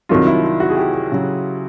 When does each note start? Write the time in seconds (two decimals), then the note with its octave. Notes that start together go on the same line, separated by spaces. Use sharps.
0.09 C2 C3 D#3 F#3 F4
0.27 E4
0.43 F4
0.60 F#4
0.69 G#4
0.77 G4
0.94 G4
1.11 C#3 F#3